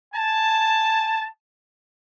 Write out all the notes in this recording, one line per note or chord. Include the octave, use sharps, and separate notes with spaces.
G#5 A5